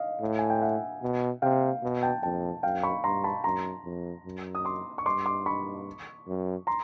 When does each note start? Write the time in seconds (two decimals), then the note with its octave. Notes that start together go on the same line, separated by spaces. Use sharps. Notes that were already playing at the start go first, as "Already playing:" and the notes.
Already playing: D#5 F5
0.21 A2
0.39 G#5
0.50 G5
0.61 E5 F#5
1.02 B2
1.42 C3 F5 G5
1.83 B2
2.03 G5 A5
2.23 F2 G5 A5
2.63 F#2 F5 G5
2.83 B5 C#6
3.04 G2 A#5 C6
3.24 A5 B5
3.44 F#2 A#5 C6
3.84 F2
4.25 F#2
4.55 D#6
4.65 C6 D6
4.98 C#6
5.06 G2 C6 D6
5.26 C6 D6
5.46 B5 C#6
6.27 F#2
6.67 A#5 C6